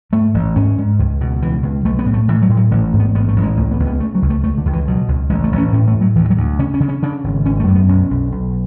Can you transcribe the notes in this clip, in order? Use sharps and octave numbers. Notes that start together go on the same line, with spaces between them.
G#2 A3
A1
G#2 C#4
G#2
C#2
B2
C#2 E3
C#2
B1 A3
B3
A2
A3
A2 E3
F#3
A2
F#3
A1 D3
G#2
B3
A1 B3
A3
A1
G#3
C#2 A3
B3
C#2
B3
C#3 A3
F#3
C#2
A3
C#2 A3
D3
C#2
E3
B2 F#3
C#2
A1 G#3
A3
A1
C#4
A2 C#4
A3
A2
F#3
D2 E3
F#3
D2
C#3 C#4
C#4
C#3
C#4
C#3 D4
G#1
G#1 C#4
A3
F#2
B3
B1 C#4
B1
B1